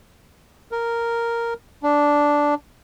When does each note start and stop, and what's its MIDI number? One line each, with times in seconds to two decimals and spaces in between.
0.72 1.54 70
1.83 2.54 62